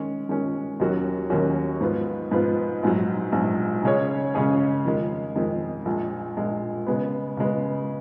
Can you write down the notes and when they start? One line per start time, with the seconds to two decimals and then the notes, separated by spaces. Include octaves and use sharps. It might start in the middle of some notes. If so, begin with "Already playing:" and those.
Already playing: D#3 G#3 C#4
0.29 D#3 G#3 C#4
0.80 D#2 D#3 F#3 C#4 F#4
1.30 D#2 D#3 F#3 C#4 F#4
1.81 G#2 F3 B3 F4
2.31 G#2 F3 B3 F4
2.83 A#1 G#2 F#3
3.32 A#1 G#2 F#3
3.83 C#3 G#3 C#4 G#4 C#5
4.35 C#3 G#3 C#4 G#4 C#5
4.85 F2 D#3 G#3
5.36 F2 D#3 G#3
5.85 A#1 A#2 G#3
6.37 A#1 A#2 G#3
6.87 C#3 G#3 B3
7.37 C#3 G#3 B3